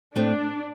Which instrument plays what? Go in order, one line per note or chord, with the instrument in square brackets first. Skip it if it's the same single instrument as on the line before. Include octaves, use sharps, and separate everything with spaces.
[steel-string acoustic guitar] A2 A3 C4 [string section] D4